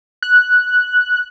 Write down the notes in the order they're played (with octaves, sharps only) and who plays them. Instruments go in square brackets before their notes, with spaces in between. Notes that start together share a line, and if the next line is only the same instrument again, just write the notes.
[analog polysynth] F#6